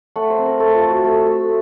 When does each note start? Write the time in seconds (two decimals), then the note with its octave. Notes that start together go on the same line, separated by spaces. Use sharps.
0.16 A3 F#5
0.30 C5
0.38 C4
0.45 A#4
0.60 A3 A4
0.75 F4
0.82 A3
0.90 F#4
1.05 A3 A4
1.27 A3